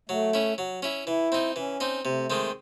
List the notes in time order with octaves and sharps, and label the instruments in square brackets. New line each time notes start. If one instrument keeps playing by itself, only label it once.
[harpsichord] F#3 [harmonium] A3
[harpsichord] C#4 E4
F#3
C#4 E4
[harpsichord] E3 [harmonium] E4
[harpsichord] C4 D#4
[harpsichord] E3 [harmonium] C#4
[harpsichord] C4 D#4
[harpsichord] C3 [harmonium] A3
[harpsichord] D#3 G#3 C4